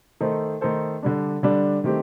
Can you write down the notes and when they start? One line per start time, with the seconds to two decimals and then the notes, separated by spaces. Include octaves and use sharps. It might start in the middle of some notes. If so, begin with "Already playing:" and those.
0.20 D#3 A3 D#4 A4 C5
0.61 D#3 A3 D#4 A4 C5
1.03 D3 G3 D4
1.43 D3 G3 D4
1.84 D#3 A3 C4 G4